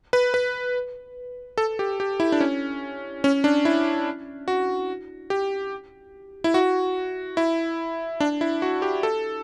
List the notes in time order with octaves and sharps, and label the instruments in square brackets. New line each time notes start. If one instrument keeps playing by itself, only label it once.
[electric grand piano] B4
B4
A4
G4
G4
E4
D4
C#4
C#4
D4
E4
F#4
G4
E4
F#4
E4
D4
E4
F#4
G4
A4